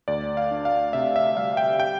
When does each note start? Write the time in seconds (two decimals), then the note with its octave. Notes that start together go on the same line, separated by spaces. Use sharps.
0.08 D2 D5
0.37 F5
0.51 D4
0.65 F5
0.93 C3 E5
1.16 E5
1.36 G3 F5
1.57 G5
1.80 G5